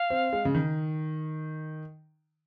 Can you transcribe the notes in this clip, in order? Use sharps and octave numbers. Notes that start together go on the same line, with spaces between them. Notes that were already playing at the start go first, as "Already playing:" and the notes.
Already playing: F5
C4
G#3
C#3
D#3